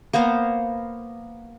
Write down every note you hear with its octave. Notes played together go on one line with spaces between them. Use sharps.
A#3 B3 C5 F5